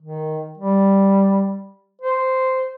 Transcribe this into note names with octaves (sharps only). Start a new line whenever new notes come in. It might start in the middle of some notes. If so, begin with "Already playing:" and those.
D#3
G3
C5